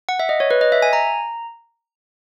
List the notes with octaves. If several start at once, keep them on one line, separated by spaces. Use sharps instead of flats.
F#5
E5
D#5
C#5
B4
D#5
E5
G#5
A#5